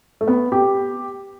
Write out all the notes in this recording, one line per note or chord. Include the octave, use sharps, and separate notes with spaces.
A3
B3
G4